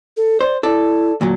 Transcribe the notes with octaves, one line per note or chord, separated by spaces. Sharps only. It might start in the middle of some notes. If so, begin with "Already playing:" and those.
A4
C5 D5
E4 A4 D5
D2 A#2 F#3